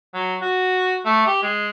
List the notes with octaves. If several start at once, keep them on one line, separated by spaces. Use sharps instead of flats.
F#3
F#4
A3
G4
G#3